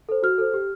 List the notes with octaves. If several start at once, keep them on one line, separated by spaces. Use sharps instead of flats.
A4 C5
F#4 F6
A4 C5
G4